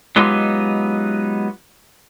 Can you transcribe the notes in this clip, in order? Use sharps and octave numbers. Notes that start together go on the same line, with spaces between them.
F#3 G#3 B3 D#4 F4 G4